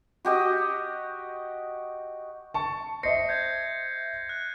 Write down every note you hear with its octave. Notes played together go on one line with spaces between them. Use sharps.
F#4 G4 D#5
A5 C#6
C5 D#5 E5 A#6 C7 C#7
G6 G#6 C#7
F#6